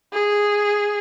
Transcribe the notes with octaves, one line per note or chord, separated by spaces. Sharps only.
G#4